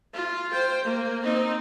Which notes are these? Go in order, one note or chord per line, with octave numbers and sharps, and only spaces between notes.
F4
C5 G5
A#3
C4 D#4